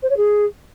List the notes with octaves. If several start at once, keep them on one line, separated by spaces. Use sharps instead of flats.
C5
C#5
G#4